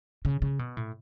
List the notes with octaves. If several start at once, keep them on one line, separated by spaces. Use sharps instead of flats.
C#3
C#3
B2
A2